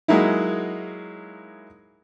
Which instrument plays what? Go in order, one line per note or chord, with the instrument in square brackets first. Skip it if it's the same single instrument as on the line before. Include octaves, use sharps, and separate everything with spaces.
[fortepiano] F#3 G#3 A#3 D#4 E4